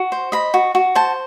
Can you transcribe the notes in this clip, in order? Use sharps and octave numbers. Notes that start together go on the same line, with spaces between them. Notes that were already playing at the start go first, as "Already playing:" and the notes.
Already playing: F#4
C5
D#5 B5
F#4
F#4
C5 A5